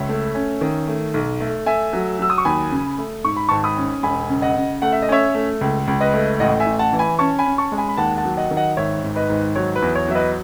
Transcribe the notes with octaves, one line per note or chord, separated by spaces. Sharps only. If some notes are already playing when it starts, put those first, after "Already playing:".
Already playing: C#2 C#5 E5
A3
C#4
D#3
A3
B1
A3
A3 E5 G#5
F#3
F#3 E6
D#6
C#6
D#2 G#5 B5
C#3
A3
G#2 C#6
B5
G#1 A5 C#6
B5 D#6
C#4
E1 G#5 B5
C#3
D#5 F#5
C#3
A3 F#5
E5
D#5
C#4 C#5 E5
A3
C#2
C#2
B4 D#5
A3
A1 D#5 F#5
E5 G#5
A1
F#5 A5
E3
G#5 B5
C#4 A5 C#6
G#5 B5
C#4
A5 C#6
G#3
G#5 B5
B5
D#2 F#5 A5
F#5 A5
F#3
D#5 F#5
D#3
D#5 F#5
G#1 C#5 E5
G#2
B4 D#5
G#1
F#3 C#5
B4
E2
C#5
F#3 E5
B4 D#5